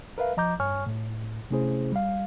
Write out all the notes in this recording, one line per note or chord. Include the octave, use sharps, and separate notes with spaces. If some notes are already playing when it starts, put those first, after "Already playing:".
A#4 B4 E5 F5
F3 D#5 A#5 D6 G6
G2 C#5 G#5 C#6 F6
A2
C3 A3 C#4 E4 G#4 C5
G3 F5